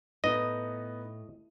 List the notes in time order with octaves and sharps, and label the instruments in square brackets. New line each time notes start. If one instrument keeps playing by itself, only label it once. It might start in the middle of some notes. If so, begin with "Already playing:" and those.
[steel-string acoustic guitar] A2 [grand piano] B3 D#4 [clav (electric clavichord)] D#5